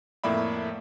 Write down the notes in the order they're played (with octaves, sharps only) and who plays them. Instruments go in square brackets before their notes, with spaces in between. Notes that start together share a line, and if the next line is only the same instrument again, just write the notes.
[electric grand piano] F2 A2 A#3 D5 E5 B5